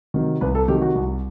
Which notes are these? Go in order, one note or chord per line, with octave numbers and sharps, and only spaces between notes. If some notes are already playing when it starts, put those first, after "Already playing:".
C3 D#3 F#3
C2 B4
A4
C3 D#3 F#3 G4
F#4
C2